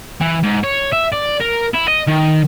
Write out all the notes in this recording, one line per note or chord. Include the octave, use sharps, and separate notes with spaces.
E3
G#2
C#5
E5
D5
A#4
E4
D#5
D#3